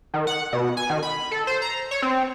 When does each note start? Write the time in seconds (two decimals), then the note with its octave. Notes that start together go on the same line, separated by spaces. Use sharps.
0.14 D#3
0.27 F#5
0.53 B2
0.77 G#5
0.90 D#3
1.03 B5
1.31 A4
1.47 C5
1.62 A#5
1.91 C#5
2.02 C4